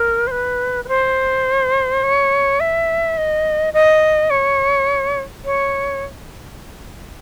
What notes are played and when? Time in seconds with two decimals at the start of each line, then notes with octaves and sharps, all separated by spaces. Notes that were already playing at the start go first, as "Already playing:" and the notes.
Already playing: A#4
0.27 C5
0.31 B4
0.85 B4
0.88 C5
2.03 C#5
2.60 E5
3.17 D#5
3.73 D#5
4.30 C#5
5.45 C#5